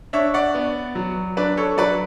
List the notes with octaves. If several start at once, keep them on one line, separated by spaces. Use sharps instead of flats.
D4 C#5 E5
D5 F#5
B3
F#3
D4 B4 D5
A4 C#5
F#3 B4 D5